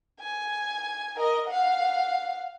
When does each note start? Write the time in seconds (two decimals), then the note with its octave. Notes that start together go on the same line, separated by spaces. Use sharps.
0.20 G#5
1.16 A#4 D#5
1.48 F5 F#5